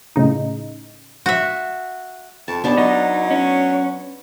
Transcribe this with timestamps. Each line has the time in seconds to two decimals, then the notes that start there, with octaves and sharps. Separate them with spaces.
0.16 A2 C#3 D#4
1.26 F#4 E5
2.48 F2 A5
2.64 D#2 B3 D4 A5
2.77 F#3 D#4
3.30 C#4